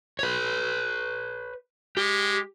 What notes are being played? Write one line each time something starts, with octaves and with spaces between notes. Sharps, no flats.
B4 C#5
G#3 G4